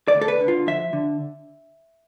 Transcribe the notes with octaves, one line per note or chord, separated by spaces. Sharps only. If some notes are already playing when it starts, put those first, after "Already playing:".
D5
D2
A4
B4
D3
F4
F3 E5
D3